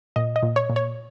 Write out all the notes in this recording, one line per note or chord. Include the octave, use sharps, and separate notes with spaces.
A#2 D#5
D#5
A#2
C#5
A#2
C#5